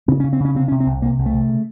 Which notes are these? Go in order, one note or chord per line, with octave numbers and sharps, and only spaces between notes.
C#3 C4
C#3 C#4
C4
C#3 C#4
C3 C4
C3 C#4
C4
C2
C3 A#3
C2
A3
C3
C#3